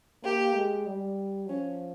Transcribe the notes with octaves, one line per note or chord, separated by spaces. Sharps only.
A#3 G4
G#3
G3
F3 C#4